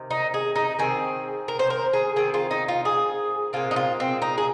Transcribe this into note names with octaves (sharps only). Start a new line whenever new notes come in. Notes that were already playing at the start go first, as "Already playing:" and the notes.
Already playing: C3 D#3
D#4
G#4
D#4
D#3 C4 G#4
A#4
C5
A#4
G#4
D#3 C4 G#4
F4
D#4
F4
G#4
A#2 G#3 C4 F4
D#4
F4
C4
D#4
G#4